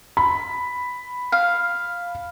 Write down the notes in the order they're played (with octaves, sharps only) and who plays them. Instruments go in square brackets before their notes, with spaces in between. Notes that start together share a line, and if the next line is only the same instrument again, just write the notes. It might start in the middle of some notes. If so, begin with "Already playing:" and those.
[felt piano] B5
[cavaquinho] F5